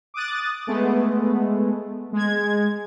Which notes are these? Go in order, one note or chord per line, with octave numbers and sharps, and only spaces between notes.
D6 D#6 F#6 A6
G#3 A3 B3
G#3 G#6